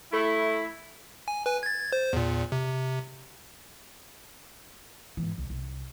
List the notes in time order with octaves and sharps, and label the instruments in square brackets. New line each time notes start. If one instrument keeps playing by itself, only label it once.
[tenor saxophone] A3 [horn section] E4
[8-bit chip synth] G#5
B4 G#5
G#6 A6
C5
E2 A#2
C3
[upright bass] G#2 E3
C2
C2